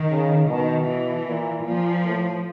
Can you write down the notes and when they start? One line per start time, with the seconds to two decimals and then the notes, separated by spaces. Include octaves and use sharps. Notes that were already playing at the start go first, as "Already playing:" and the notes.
Already playing: D#3
0.11 C#3
0.49 B2 D#3
0.89 E3
1.28 A#2
1.68 A#2 F3
2.06 A2